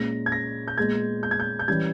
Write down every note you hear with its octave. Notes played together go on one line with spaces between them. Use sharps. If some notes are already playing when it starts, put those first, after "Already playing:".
Already playing: A#2 G#3 C#4 A#6
G#6
A#6
G6
A#2 G#3 B3 G#6
G6
G#6
G6
G6
E3 G3 C#4 G#6